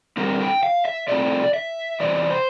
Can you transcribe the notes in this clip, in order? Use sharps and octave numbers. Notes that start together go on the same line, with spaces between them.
D3 G3 C4 A#4
G5
F5
E5
C3 F3 A3 C4 D5
E5
E2 C3 C4 D5
C5